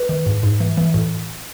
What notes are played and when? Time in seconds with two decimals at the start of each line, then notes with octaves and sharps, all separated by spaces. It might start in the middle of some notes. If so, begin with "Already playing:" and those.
Already playing: B4
0.09 D#3
0.26 G#2
0.43 G#2
0.60 E3
0.77 E3
0.94 A2